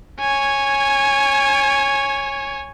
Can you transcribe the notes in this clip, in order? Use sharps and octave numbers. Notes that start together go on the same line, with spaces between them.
C#5 G#5